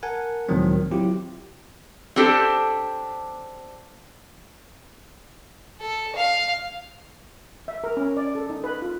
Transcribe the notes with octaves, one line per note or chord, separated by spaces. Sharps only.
A#4 F#5 G#5 A5
C#2 A2 D#3 F3 F#3 C4
F#3 C4 E4 F4 G4
C4 D4 G4 A4 C5
A4
F5
E5
A#4
C#4
D5
A4
D#4
B4
F4